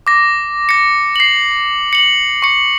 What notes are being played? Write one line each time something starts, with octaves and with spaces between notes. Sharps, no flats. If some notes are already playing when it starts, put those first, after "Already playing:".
D6 A#6
A#6 C#7
C7 F#7
C#7 F#7
C#6 C#7